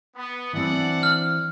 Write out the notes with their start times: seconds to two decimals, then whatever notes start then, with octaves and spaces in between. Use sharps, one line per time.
0.16 B3
0.53 E3 C4 D4 D5 F#5
1.03 F6